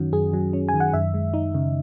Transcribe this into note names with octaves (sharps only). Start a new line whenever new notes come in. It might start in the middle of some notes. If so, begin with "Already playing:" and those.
Already playing: F#2 D#3 F#3 C#4 F#4
F#2 G#4
F#3
C#4
G#5
D#3
F#5
F#2 E5
G#3
D#4
C#3